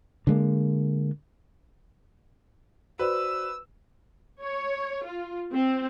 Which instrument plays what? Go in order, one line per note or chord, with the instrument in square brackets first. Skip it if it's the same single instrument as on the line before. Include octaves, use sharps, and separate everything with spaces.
[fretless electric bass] D3 G#3 A#3
[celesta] F#4 C5 D5 [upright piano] B4 [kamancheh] E6
[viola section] C#5
F4
C4